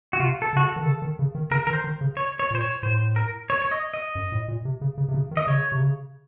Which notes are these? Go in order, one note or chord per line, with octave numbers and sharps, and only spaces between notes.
F#4
C3 F4
A4
C#3 F#4
A4
D#3
C#3
D#3
C#3
D#3
C#3 A#4
D#3 A#4
C5
D#3
C#3
C#5
C#5
A#2 C5
C#5
A2 C5
A#4
C#5
C#5
D#5
D#5
F#2
A2
A#2
C3
C#3
C#3
C3
C#3
D#3
D#5
C#3 C#5
C3
C#3